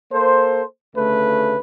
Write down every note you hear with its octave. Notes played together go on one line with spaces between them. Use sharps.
A#3 A4 C5
D2 C#3 A3 B4